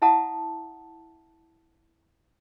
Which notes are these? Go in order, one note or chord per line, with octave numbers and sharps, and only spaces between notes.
E4 E5 F#5 A5 A#5 D#6